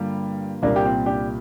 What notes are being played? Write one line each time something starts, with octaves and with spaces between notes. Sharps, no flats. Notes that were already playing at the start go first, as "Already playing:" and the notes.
Already playing: G2 D3 G3 A#3 F4
C2 A#2 G3 A#3 D4
G4
C4 F4
D4 G4